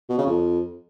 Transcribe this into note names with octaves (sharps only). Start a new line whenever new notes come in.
B2
C#3
F2